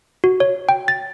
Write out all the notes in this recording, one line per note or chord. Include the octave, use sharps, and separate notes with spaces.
F#4
C#5
G5
A6